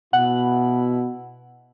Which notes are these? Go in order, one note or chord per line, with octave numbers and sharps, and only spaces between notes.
B2 E4 F#5